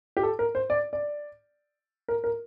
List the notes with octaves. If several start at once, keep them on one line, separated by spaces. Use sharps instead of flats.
G4
A4
A#4
C5
D5
D5
A#4
A#4